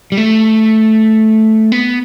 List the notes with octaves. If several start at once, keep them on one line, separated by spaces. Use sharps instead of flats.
G3
A3
B3